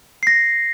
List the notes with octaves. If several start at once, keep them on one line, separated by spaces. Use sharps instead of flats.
C7
A#6